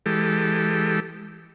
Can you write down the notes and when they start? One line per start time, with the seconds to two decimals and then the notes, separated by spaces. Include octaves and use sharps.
0.06 E3 G#3 G4 A4